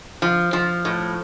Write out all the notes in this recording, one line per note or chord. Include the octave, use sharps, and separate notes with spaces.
F3
F3
A2